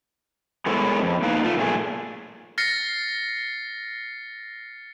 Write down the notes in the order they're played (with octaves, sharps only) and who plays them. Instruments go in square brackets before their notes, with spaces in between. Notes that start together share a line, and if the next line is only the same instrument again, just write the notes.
[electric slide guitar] G#3 B3 E4 A4 A#4 C#5
F2
A#3 D4 D#4 B4 F5
A3 F4
A#2 A3 G#4
[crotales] F6 A6 A#6 C7 C#7